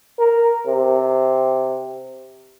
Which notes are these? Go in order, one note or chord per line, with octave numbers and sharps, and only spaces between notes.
A#4
C3